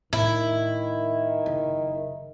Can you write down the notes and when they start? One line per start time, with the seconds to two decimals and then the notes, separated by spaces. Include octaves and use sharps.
0.13 A2 D#3 E4
1.46 F#1